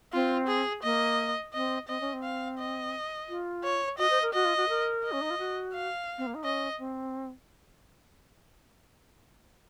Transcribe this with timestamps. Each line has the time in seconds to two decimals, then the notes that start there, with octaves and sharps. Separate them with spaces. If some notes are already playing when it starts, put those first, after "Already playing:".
0.13 C4 F4
0.48 G#4
0.83 A#3 D#5
1.54 C4 D#5
1.88 C4 D#5
2.01 C#4
2.13 C4
2.23 F5
2.58 D#5
3.29 F4
3.64 C#5
3.98 F#4 D#5
4.10 C5
4.22 A#4
4.33 F#4 D#5
4.45 F4
4.57 F#4
4.69 A#4
5.04 D#5
5.12 C#4
5.21 D#4
5.30 F4
5.38 F#4
5.74 F5
6.18 C4
6.27 A#3
6.35 D#4
6.44 C#4 D#5
6.78 C4